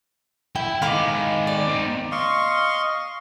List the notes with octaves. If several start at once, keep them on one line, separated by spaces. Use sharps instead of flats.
E4 G5
D#3 G#3 F5 B5 D6
D5
C4 D#4
D#5 F5 C6 C#6